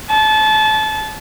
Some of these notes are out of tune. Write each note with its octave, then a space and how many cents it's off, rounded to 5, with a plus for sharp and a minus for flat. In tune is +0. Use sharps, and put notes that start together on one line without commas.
A5 -25